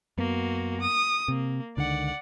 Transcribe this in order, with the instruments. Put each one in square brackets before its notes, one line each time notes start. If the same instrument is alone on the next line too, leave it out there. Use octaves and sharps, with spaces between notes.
[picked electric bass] F#2 B3 [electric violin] A#3 F#4
[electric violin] D#6
[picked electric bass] C3 [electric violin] A#3
[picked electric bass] C#2 D3 D#3 [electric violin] D5 F#5